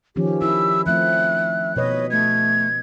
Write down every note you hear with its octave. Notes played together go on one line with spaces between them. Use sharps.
D#3 F3 C#4 G4
E4 E6
F3 A3 C4 E5 F#6
B2 B4 C#5 D#5
A3 G#6